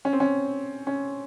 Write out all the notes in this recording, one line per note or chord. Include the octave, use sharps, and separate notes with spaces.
C#4
C4
C#4
C#4